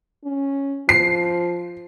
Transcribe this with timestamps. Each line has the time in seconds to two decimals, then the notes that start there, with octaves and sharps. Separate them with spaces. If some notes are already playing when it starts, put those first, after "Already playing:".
0.25 C#4
0.89 F3 C7